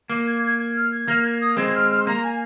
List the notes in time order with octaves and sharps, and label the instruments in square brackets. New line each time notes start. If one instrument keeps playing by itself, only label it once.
[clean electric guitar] A#3
[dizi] G#6
G#6
G#6
F6
G#6
[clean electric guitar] A#3 [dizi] F6
[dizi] G#6
D#6
[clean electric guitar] G#3 C4 [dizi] G#6
[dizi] G#6
F6
F6
C6
[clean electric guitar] A#3 [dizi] A#5
[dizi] G#5